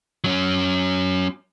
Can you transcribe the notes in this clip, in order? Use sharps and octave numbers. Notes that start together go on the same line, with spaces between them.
F#3 C#4